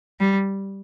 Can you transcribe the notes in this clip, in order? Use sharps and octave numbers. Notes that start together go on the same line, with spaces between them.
G3